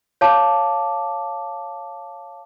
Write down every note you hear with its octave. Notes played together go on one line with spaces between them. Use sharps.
C#5 F5 A5 D6